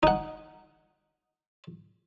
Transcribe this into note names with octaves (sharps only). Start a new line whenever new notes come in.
D#4 F#5